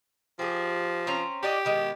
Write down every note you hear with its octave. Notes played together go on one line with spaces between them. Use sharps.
F3 G4 G#4
C4 C#4 A#5
F#4 G4 D5 D#5
B2 D#3 G#3